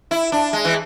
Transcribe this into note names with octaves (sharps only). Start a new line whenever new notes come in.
E4
D4
G#3
E3